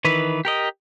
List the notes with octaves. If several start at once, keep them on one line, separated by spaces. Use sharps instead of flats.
D#3 E3 B4
G4 A#4 D#5